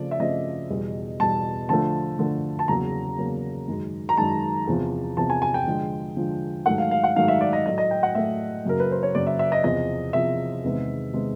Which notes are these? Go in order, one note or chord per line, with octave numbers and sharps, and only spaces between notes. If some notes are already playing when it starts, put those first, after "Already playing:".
Already playing: C#3 F3 A3 C4 D5
E5
C#3 F3 A3 C4 D#5
E2 B2 G3
E2 B2 G3 A5
D3 F3 A3 A5
D3 F3 A3
A5
E2 C#3 F#3 A#3 C#4 A#5
E2 C#3 F#3 A#3 C#4
F#2 D#3 G#3
A#5
F#2 D#3 G#3 A5
E2 C3 F3
E2 C3 F3 A5
G#5
G#5
G5
D3 F3 G#3
D3 F3 G#3
G#2 D#3 F#3 A3 F#5
F5
F5
F#5
G#2 D#3 F#3 A3 F5
E5
D5
D#5
A2 F#3 A3 D#5
D#5
G5
F#5
A2 F#3 A3 E5
F#2 C#3 F#3 A#3 A#4
B4
C5
C#5
F#2 C#3 F#3 A#3 D5
E5
E5
D#5
E2 C3 F3 D#5
E2 C3 F3 E5
E2 C3 D#3 G#3 B3
C3 D#3 G#3 B3